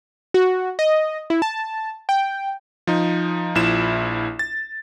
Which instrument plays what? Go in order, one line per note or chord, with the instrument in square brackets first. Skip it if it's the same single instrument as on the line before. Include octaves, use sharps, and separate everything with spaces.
[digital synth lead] F#4
D#5
E4
A5
G5
[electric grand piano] F3 D#4
A#1 F3 E4 E7
A6